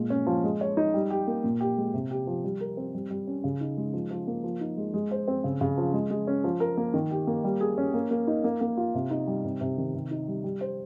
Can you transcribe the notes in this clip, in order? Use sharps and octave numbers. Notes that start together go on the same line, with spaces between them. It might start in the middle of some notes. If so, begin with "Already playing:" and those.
Already playing: A#2 G#3
C#4
F3
G#3
C#5
D#4
G3
G4
A#3
A#2
G4
G#3
C3
G4
F3
G3
A#4
C4
G3
G3
C#4
C#3
D#4
G#3
F3
F3
A#3
F3
D#4
G#3
G#3
C5
C4
C#3
C#3
F3
G#3
G#3
C#4
F3
A#4
A#3
D#3
G4
A#3
G3
G#4
C#4
A#3
A#3
D#4
A#3
A#3
F4
C3
D#4
G3
C3
C3
D#3
C3
D#4
G3
G3
C5